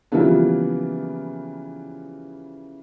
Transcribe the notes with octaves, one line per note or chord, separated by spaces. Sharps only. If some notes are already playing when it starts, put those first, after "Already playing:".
C#3 E3 F3 G3 A#3 B3